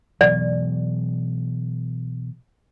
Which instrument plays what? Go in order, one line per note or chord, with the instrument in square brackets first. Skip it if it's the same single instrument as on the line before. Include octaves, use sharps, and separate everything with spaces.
[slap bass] B2 E3 F#3 [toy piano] D5